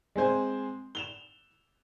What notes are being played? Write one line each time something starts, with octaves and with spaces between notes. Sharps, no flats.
G#3 C4 C5 G#5
E7 F7 G7